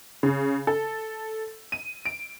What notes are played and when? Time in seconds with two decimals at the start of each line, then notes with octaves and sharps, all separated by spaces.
0.23 C#3
0.67 A4
1.72 D#7
2.05 D7